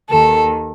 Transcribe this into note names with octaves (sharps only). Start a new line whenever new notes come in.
D#2 D#3 A4